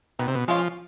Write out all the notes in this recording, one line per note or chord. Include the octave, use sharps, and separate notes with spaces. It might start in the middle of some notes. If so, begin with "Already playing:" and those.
B2 D#3
C3
B2
F3 G#3 C#4 F4